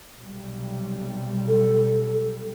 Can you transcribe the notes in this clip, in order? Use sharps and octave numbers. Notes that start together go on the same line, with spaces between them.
B1 C3 G3
A4